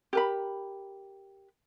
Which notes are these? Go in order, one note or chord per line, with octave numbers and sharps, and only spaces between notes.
G4 A#4 B5